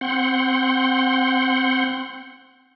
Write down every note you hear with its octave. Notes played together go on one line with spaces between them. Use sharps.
C4 F#5 C6